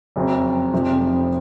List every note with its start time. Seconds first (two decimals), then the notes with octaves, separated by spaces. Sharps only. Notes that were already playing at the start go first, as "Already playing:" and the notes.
0.16 F#1 F2 C#3 F#3 C4
0.73 F1 F2 C3 F3 C4